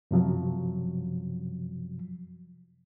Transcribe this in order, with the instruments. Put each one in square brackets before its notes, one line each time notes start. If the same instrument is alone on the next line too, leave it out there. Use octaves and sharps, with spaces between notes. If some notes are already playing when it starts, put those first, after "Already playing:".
[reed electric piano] F#2 C3 F3 F#3